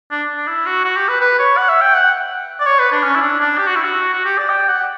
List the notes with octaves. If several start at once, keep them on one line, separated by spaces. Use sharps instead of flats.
D4
D4
E4
F#4
F#4
G4
B4
B4
C#5
F#5
E5
G5
F#5
D5
C#5
B4
D4
C#4
E4
D4
D4
G4
F#4
E4
F#4
F#4
G4
D5
G5
F#5